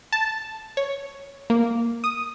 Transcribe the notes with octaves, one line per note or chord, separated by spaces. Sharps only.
A5
C#5
A#3
D#6